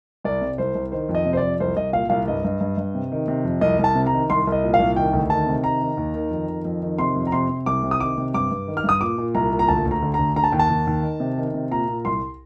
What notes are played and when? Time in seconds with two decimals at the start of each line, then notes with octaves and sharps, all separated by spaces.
0.24 C2 D5
0.41 C3
0.58 C2 C5
0.75 C2
0.92 D#3 C5
1.09 F2
1.15 D#5
1.26 C3
1.33 C5
1.37 F2 D5
1.60 C2 C5
1.77 C2 D#5
1.93 A#2 F5
2.10 C2 F5
2.28 G2 D#5
2.44 G2
2.61 G2
2.77 G2
2.95 C3
3.12 D#3
3.28 C3
3.44 F2
3.61 C2 D#5
3.79 C2
3.84 A5
3.95 C3
4.07 A#5
4.13 D#3
4.30 C2 C6
4.47 C2
4.52 D#5
4.63 A#2
4.74 F5
4.79 C2
4.96 D#3 G5
5.13 D2
5.30 D#3 A5
5.47 C3
5.64 D#3 A#5
5.81 D#3
5.97 D#2
6.14 D#3
6.31 F2
6.49 D#3
6.65 F2
6.83 D#3
6.98 C3 C6
7.16 F2
7.27 A#5
7.32 C3 C6
7.49 C3
7.66 C2 D6
7.83 C3
7.91 D#6
8.00 D#3 D6
8.18 C3
8.34 G2 D6
8.51 G2
8.68 D#3
8.77 F6
8.84 G2 D#6
9.01 A#2 D6
9.18 A#2
9.35 C2 A#5
9.51 A#2
9.59 A#5
9.68 D2 A5
9.85 D2
9.91 A#5
10.02 D3
10.14 D2 A#5
10.36 D3 A#5
10.44 A5
10.52 D#2 G5
10.59 A5
10.70 D#2
10.87 D#2
11.03 D#3
11.20 C3
11.38 D#3
11.54 C3
11.71 A#2 A#5
11.88 A#2
12.05 C2 C6